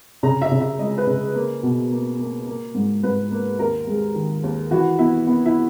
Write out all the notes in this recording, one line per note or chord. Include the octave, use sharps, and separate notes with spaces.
C#3 A#5
E5
C#3
E5
G#3 D#5
B4
C#3
A#3
B2
A#3
A#3
A#3
G#2
G#2 B4
A#3
D#2 A#4
G#3
D#3
D#2
E3 F#4
B3 E4
B3
E4